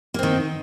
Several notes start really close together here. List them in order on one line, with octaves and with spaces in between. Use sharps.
A#3 C4 D#3